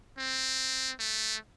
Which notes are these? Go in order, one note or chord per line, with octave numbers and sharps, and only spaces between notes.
C4
A3